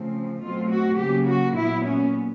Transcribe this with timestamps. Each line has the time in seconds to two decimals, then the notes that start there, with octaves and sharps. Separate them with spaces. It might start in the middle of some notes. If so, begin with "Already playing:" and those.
Already playing: C#3 F3 A3 C4
0.41 B2 F#3 A3 C4 F4
0.70 F#4
0.98 C#3 F#3 A#3 G4
1.28 F#4
1.57 A#2 F#3 B3 E4
1.85 C#4